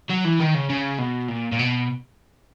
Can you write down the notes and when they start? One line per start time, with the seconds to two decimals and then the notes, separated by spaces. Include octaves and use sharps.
0.09 F#3
0.25 E3
0.40 D#3
0.54 C#3
0.69 C#3
0.98 B2
1.28 A#2
1.52 A#2
1.59 B2